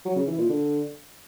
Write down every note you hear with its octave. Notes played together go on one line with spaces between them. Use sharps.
F#3
C#3
E3
A#2
D3